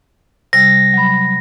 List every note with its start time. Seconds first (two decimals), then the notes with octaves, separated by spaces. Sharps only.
0.53 C3 G3 A#6
0.94 F#3 B5